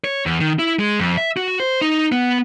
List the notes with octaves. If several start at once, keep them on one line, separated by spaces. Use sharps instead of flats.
C#5
E2
D#3
E4
G#3
F2
E5
F#4
C5
D#4
B3